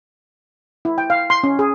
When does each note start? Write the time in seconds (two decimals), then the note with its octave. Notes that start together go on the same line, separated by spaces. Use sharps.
0.85 E4
0.98 G5
1.10 F5
1.30 C6
1.43 C#4
1.59 G#4